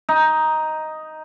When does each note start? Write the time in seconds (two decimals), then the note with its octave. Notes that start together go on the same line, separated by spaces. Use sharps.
0.09 D#4